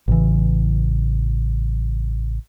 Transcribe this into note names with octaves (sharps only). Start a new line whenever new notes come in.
A1 C#3 E3